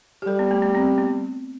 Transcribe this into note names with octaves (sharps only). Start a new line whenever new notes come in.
G4
G3 A4
B3
A3
B3
C4
B3